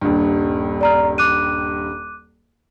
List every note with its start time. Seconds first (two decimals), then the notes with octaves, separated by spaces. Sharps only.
0.02 D#1 G2
0.81 D5 A#5 F6
1.18 D6 F#6 D#7